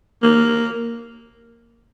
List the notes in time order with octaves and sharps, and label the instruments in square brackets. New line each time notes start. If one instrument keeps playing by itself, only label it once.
[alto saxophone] A#3